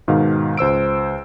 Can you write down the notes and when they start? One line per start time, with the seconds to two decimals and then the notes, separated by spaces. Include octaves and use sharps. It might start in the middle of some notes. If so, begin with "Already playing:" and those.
0.08 G#2 B2 D#3 F5
0.57 C#2 C5 E6 D7